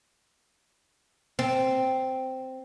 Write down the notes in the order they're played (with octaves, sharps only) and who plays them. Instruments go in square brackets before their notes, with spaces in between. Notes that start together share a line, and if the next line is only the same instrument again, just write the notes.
[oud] C4